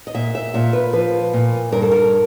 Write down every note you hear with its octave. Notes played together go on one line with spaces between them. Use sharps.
D#5
A#2 E5
E5
A#2 E5
B4
F3 B4
A#2
G2 A#4
A4
A#4